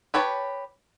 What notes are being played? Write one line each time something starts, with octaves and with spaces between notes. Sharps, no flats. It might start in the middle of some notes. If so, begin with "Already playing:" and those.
G4 B4 C#5 A5